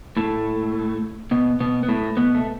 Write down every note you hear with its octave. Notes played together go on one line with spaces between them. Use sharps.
A2 A3
B2 B3
B2 B3
B3
A2 A3
B2 B3
A3